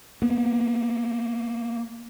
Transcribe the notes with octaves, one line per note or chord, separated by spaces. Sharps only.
A#3 B3